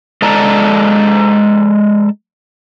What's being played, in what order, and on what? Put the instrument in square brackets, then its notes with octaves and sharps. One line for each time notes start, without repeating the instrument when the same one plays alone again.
[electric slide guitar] G#3 A4 D5 A5 A#5